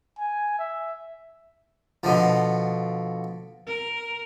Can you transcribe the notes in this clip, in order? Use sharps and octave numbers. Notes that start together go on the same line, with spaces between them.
G#5
E5
B2 D3 F3
A#4